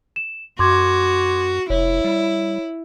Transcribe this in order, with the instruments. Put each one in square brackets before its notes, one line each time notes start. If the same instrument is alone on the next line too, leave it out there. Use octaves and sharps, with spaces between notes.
[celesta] E7
[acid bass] F#2 [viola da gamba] F#4 [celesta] C6 D6 G#6
[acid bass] F1 [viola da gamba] E4 [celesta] C#5
[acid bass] G3